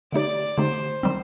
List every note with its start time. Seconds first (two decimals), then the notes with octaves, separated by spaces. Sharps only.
0.12 D3 A3 D#4 G4 D5
0.58 D3 A3 D#4 G4 C5
1.03 D#3 G3 C4